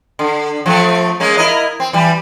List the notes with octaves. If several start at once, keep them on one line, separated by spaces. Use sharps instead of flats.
D3
F3 A3 C4
G#3 A#3 C#4
E4 A#4 D#5
C4
E3 G3